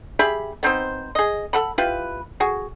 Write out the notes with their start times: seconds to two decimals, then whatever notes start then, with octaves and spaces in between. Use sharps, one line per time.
0.19 G4 G#4 E5 B5
0.63 B3 C4 D#4 C5
1.15 G#4 D#5
1.53 A4 F#5 B5
1.78 E4 F4 G4 B4
2.40 F#4 G#4